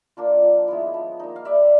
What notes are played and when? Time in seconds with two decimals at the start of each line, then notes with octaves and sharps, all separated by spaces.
0.17 A#3 D4 F4
0.42 F3
0.68 G#3 B3 E4
0.94 F3
1.20 A#3 D#4
1.36 F5
1.45 G3 D5 E5